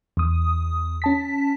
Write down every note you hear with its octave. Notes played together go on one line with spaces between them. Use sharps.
E2 D#6
C#4 A5 B6